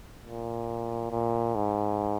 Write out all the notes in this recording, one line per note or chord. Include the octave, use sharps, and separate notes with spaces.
A#2
A#2
G#2